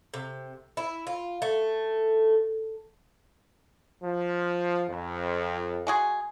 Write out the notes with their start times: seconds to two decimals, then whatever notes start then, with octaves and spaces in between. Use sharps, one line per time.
0.14 C3
0.77 E4
1.07 F4
1.42 A3
4.04 F3
4.89 F2
5.87 G#3 F#4 G#4